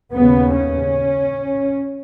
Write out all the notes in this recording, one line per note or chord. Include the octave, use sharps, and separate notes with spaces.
D#2 C#3 B3
C#4